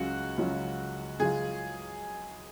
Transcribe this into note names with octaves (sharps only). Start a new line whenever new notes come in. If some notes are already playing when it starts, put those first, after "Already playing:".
Already playing: C#2 C#3 F#3 C#4 F4 F#4
C#2 C#3 F#3 C#4 F4
C#2 C#3 F#3 C#4 F4 G#4